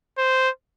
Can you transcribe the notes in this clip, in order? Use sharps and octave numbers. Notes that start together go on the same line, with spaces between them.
C5